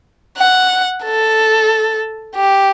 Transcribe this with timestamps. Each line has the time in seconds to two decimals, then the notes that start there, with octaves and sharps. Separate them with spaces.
0.37 F#5
1.04 A4
2.35 G4